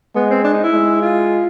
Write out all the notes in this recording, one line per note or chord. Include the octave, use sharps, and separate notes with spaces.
G#3 B3
C4
D4
D#4
E4
G#3
F4